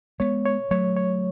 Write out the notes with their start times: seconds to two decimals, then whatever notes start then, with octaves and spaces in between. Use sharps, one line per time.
0.20 G#3 B3 C#5
0.46 C#5
0.71 F#3 A3 C#5
0.97 C#5